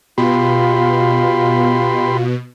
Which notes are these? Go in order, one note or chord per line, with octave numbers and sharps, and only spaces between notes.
B2 F4 G4 B5 C6